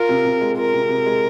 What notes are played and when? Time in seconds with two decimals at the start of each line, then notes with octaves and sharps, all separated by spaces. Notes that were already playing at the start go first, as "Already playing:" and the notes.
Already playing: F4 A#4
0.09 C3
0.25 C3
0.41 G#3
0.57 F4 A#4
0.74 C3
0.89 C3
1.06 G#3